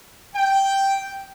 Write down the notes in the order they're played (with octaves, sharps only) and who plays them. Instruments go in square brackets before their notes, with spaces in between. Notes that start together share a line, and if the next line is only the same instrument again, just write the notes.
[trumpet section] G5